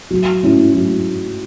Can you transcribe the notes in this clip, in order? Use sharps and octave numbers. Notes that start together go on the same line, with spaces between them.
F#3
C#4 E4
F#3